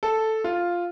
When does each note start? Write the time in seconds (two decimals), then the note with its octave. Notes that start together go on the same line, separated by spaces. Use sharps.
0.03 A4
0.44 F4